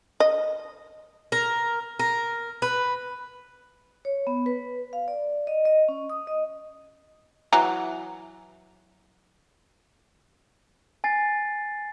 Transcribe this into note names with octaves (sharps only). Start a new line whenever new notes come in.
D#5
A#4
A#4
B4
C#5
B3
B4
F5
D5
D#5
D#5
C#4
D#6
D#5
E3 F#3 A#5
G#5 A6 C7